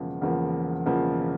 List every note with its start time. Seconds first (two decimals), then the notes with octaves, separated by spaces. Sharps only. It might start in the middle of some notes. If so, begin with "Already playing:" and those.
Already playing: E1 E2 C#3 F3 A#3
0.21 E1 E2 C#3 F3 A#3
0.86 E1 E2 C#3 F3 A#3